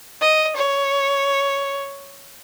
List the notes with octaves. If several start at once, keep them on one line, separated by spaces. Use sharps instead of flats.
D#5
C#5